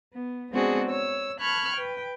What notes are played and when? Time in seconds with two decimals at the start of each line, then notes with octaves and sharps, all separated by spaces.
0.14 B3
0.51 G#3 B3 C4 D4 F#4 G#4
0.89 C#5 E6
1.41 A5 B5 C#6 F6 F#6 G#6
1.74 B4 G5